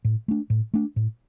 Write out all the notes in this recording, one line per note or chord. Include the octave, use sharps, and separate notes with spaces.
A2
A3 D4
A2
A3 D4
A2